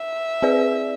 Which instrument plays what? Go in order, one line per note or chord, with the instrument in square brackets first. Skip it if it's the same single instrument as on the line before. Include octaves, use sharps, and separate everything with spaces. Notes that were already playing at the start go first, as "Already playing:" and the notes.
Already playing: [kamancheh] E5
[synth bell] C4 G#4 B4 D5